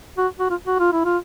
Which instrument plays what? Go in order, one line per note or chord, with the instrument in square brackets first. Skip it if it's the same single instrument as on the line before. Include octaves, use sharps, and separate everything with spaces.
[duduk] F#4
F#4
F4
F#4
F4
E4
F4